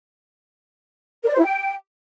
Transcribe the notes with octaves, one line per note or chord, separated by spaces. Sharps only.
A#4
D5
C5
E4
G5